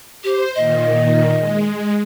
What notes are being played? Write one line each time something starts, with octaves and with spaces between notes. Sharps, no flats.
G4 C5
A#2 D#3 D#5
G#3